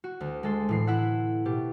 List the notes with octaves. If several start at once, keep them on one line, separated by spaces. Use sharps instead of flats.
F#4
D2
G#3 A4 C6
A2 E3 C7
E4 E5 F#5
B2 G4